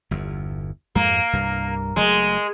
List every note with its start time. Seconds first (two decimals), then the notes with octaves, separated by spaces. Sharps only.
0.11 G1 E2
0.95 F2 G#2 G#3 A#3
1.33 C2 G2
1.96 F#1 F#3 G#3 A3